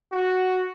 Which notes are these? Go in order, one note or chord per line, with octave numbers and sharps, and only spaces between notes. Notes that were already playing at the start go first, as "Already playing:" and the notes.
F#4